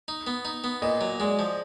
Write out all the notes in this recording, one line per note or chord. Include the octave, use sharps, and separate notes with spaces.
D#4
B3
D#4
B3
A#2 D#5
F#3
G#3 D5
F3